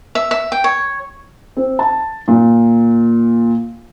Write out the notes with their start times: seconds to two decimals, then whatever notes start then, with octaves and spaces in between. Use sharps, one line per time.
0.15 E5
0.31 E5
0.52 G5
0.64 C#5
1.57 C4
1.79 A5
2.28 A#2